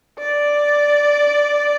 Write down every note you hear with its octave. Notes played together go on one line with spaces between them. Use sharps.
D5